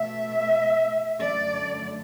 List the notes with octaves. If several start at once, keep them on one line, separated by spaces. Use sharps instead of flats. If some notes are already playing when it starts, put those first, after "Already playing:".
Already playing: B2 A3 E5
F#2 D3 A3 D5